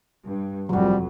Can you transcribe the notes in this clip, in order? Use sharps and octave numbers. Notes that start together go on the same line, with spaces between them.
G2
F1 F2 F#3 G3 F#4